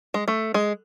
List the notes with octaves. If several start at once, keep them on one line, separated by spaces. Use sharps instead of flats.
G#3
A3
G#3